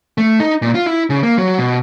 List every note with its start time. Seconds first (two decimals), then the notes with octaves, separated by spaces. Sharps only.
0.18 A3
0.40 D#4
0.62 A#2
0.75 F4
0.86 E4
1.10 C#3
1.23 A#3
1.38 F#3
1.58 B2